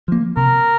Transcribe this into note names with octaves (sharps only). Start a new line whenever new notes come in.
F3 A#3
C3 A#4